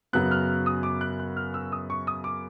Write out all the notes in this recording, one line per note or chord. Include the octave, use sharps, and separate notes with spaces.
F#2 C#3 F#3 B3 F#6
F6
D#6
D6
F#6
F#6
F6
E6
D#6
C#6
D#6
D6